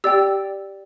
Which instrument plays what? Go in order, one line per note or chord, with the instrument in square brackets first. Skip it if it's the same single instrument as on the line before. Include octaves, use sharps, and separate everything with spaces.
[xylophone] G4 D5 G5 E6